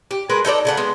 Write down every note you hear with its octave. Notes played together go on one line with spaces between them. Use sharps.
G4
G#3 A#4 B4
D#4 A4 A#4 D5
C#3 A3 F#5
G#3 B3